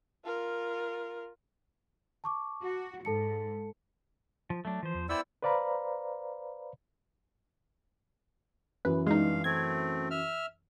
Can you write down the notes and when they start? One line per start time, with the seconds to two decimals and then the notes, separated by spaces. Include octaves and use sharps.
0.25 F4 A#4
2.24 A5 C#6 D6
2.64 F#4
3.05 G#2 A4 A5 C#7
4.50 F3
4.65 F#3 A3 D4
4.83 E3 F3 C5
4.94 E2
5.09 B3 E4 C5 D5 G5 E6
5.42 B4 C5 D5 F5 A#5 B5
8.85 F#2 E3 B4
9.06 G2 G#3 D#4 F5
9.44 A3 C4 G#6
10.11 E5 F6